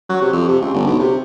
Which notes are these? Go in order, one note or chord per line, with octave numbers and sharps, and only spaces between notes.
F#3
C3
F2
C3
C#2
G1
B1
C3